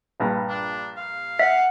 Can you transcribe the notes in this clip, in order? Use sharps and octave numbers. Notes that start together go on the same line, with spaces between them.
A#1 G2
D4
F5
E5 F#5